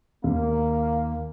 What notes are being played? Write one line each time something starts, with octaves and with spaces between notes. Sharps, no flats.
D#2 A#3